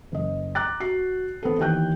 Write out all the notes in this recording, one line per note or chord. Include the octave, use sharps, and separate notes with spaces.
F#1 D#5
A#5 D6 F#6 A6
F#4 C7
B3 C4 A4
D#2 D#3 E3 G5 F#6 G6